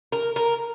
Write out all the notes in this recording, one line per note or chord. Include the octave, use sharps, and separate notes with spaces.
A#4
A#4